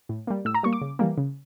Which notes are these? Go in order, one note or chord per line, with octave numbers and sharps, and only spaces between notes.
A2
G3 A#3
A2 E6
A#5
G3 A#3 C#6
D6
C#3
E3 G3 A#3
C#3